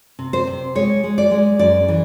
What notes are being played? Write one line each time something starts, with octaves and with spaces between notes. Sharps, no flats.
C3
C5
C3
G#3 C#5
G#3
D5
G#3
F#2 D5
E3